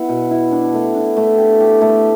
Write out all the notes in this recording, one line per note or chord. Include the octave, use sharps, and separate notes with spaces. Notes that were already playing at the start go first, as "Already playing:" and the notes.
Already playing: B3 E4
B2
E4
D4
A3
D4
A3
G4
G4
A3